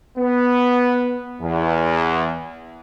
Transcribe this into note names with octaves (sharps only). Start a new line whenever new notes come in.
B3
E2